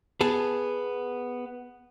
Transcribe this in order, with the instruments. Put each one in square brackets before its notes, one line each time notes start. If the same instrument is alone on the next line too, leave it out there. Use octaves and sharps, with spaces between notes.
[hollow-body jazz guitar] B3 G#4 A5